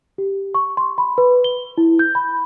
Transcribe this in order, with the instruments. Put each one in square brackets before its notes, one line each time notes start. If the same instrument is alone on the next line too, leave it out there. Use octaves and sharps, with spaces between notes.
[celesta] G4
C#6
C6
B5
B4
G7
E4
G6
B5